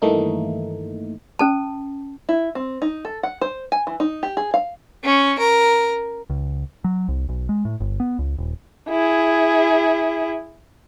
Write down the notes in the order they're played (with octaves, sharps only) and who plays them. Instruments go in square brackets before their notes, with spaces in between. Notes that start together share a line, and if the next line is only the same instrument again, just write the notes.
[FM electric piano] G2 D#3 E3 A3 A#3 D#4
[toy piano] C#4 A4 A5
[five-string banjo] E4
C4
D#4
A4
F#5
C5
G#5
E3
D#4
G4
G#4
F5
[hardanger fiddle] C#4
A#4
[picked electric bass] C#2
F#3
C2
B1
G#3
A2
G1
B3
C#2
D#1
[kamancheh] E4 G#4